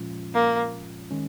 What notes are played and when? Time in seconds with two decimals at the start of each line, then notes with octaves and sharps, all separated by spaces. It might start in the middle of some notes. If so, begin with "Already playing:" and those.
Already playing: A#2 F3 G#3 C#4 F4
0.35 A#3
1.11 D#3 G#3 C#4